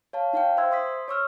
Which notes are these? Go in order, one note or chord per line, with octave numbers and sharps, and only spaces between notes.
C#5 F5 A5
D#4 F5 G5
C5 E5 C6 E6 G#6
C6 D#6 B6
C#5 C#6 E6 F6